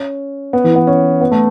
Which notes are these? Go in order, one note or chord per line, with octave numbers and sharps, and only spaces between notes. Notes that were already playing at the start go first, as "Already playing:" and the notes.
Already playing: C#4
B3
E3
B3
C#4
B3
A3